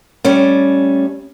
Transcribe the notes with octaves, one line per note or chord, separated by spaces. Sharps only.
G3 A3 C#4